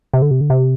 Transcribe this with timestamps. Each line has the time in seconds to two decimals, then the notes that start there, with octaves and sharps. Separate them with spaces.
0.13 C3
0.22 D3
0.31 C3
0.41 D3
0.50 C3